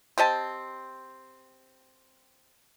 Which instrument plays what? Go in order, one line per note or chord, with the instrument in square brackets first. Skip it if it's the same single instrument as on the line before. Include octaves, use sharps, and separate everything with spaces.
[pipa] C4 G4 D#5 A5